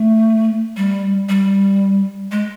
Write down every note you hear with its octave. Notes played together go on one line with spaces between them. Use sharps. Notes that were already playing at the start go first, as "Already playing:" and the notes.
Already playing: A3
G3
G3
G#3